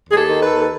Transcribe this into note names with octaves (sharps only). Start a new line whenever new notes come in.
D#2 G#4
G4 A4
D#3
A4 B4
D#2
A4